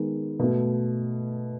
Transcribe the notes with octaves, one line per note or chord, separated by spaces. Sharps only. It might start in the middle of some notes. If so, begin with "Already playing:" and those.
Already playing: D#3 G#3 B3
B2 A3